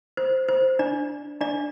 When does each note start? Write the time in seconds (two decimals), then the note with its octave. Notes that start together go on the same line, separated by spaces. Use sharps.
0.17 C5
0.48 C5
0.79 D4 D5
1.41 D4 D5